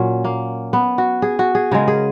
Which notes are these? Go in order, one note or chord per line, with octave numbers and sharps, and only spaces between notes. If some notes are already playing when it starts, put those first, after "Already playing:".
Already playing: A#2 F#3 C#4
A#3
B3
F#4
G#4
F#4
G#4
C#3 G#3 A#4
G#4